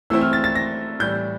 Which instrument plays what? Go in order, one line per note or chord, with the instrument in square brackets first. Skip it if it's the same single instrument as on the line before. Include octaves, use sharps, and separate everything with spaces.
[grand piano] E3 A3 C4 E4 E6
F6
A6
A6
A#6
A2 E3 G3 G6